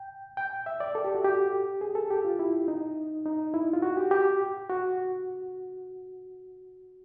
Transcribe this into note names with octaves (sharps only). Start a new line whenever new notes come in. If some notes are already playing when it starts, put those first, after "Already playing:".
Already playing: G5
G5
E5
D5
A4
G4
F#4
G4
G#4
A4
G4
F4
E4
D#4
D#4
E4
F4
F#4
G4
G4
F#4